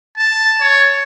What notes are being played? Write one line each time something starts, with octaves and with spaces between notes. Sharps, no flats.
A5
C#5